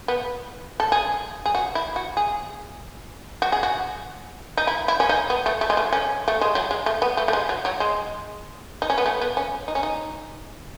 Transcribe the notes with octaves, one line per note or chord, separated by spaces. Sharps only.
B3
A4
G#4
G#4
F#4
E4
F#4
G#4
F#4
G#4
F#4
D#4
E4
E4
C#4
D#4
B3
A3
A3
G#3
A3
C#4
A3
G#3
F#3
G#3
A3
B3
A3
A3
G#3
F#3
F#3
G#3
D#4
C#4
B3
A3
B3
C#4
D#4
C#4
D#4